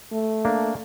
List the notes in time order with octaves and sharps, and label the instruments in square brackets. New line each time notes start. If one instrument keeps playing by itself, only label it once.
[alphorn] A3
[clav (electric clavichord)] A#3 D4